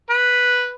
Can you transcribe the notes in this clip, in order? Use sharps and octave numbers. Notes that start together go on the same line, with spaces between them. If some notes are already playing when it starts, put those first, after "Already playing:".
B4